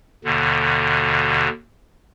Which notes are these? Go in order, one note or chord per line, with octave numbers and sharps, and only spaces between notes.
D#2 B2 D3